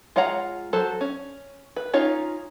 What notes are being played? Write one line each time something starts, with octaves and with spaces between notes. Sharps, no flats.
G#3 F4 C#5 F#5 A#5
F#3 A4 C5
C#4
B4
C#4 D#4 F4 C#5